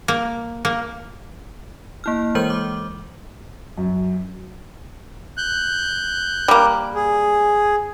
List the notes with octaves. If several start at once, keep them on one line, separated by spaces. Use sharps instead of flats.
A#3
A#3
A#3 E4 F6
E3 G#3 A#4 C5 G6 F#7
D6
F#2
F#6 G6
G3 A#3
G#4